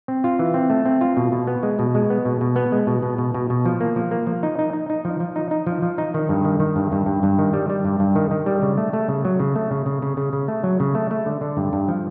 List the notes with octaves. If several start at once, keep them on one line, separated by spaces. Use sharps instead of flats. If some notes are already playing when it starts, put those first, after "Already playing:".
C4
F4
E3
C4
A3
C4
F4
B2
B2
B3
G#3
B2
G#3
B3
B2
B2
B3
G#3
B2
B2
B2
B2
B2
F3
A#3
F3
A#3
F3
D#4
D#4
D#4
D#4
F3
F3
D#4
D#4
F3
F3
D#4
D#3
G2
D#3
D#3
G2
G2
G2
G2
D#3
G3
G3
G2
G2
D#3
D#3
G3
C#3
A3
A3
C#3
F#3
C#3
A3
C#3
C#3
C#3
C#3
C#3
A3
F#3
C#3
A3
A3
D3
D3
G2
G2
F3